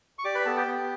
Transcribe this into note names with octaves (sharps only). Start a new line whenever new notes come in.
C#6
G4 D5 D6
B4 B5
B3 A4 A5
G4 G5
B3